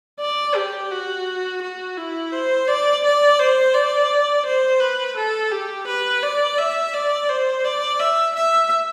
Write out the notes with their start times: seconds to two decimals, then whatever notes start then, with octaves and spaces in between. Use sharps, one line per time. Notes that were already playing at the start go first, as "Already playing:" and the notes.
0.20 D5
0.55 G4
0.91 F#4
1.62 F#4
1.97 E4
2.33 C5
2.68 D5
3.04 D5
3.39 C5
3.74 D5
4.46 C5
4.80 B4
5.16 A4
5.51 G4
5.87 B4
6.23 D5
6.58 E5
6.94 D5
7.29 C5
7.65 D5
8.00 E5
8.35 E5